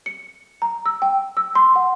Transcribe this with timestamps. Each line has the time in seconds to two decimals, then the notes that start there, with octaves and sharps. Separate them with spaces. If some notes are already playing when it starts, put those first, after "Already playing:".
0.06 C#7
0.62 A#5
0.86 E6
1.02 G5
1.37 E6
1.55 C6
1.76 F#5